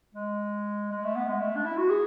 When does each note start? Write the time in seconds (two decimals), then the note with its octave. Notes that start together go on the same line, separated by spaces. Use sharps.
0.15 G#3
0.91 G#3
1.04 A3
1.16 B3
1.28 G#3
1.41 A3
1.56 D4
1.65 E4
1.77 F#4
1.90 G#4